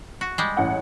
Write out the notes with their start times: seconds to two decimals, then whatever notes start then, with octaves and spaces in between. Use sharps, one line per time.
0.21 F#4
0.38 G3 G#3
0.57 A1 F#5